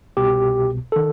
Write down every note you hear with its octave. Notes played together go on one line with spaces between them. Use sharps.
C2 B2 G4
D#3 A4